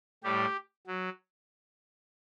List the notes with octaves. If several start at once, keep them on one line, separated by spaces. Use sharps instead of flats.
A2 G3 G4
F#3